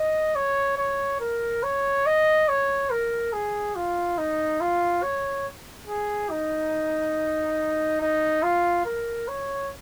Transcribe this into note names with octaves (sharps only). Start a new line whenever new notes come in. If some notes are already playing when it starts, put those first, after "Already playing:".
Already playing: D#5
C#5
C#5
A#4
C#5
D#5
C#5
A#4
G#4
F4
D#4
F4
C#5
G#4
D#4
D#4
F4
A#4
C#5